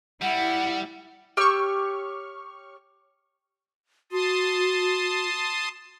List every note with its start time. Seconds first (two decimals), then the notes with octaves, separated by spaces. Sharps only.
0.22 G3 E4 F#5
1.37 G4 C#5 C#6 E6 F6
4.12 F#4 A5 C6 D#6